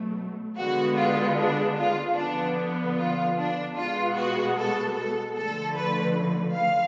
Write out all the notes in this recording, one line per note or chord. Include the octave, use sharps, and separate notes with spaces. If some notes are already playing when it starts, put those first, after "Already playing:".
Already playing: B2 F#3 A3
D3 G#3 B3 F#4
F4
D4
F4
D3 F3 B3 D4
F4
D4
B2 G#3 B3 F4
F#4
A4
A4
D3 F3 A3 A4
B4
F5